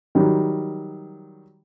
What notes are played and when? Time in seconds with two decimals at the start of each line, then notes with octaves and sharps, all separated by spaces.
0.15 D#3 F#3 G3